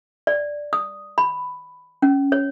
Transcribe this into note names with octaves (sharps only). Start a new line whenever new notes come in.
D5
D#6
B5
C#4
C#5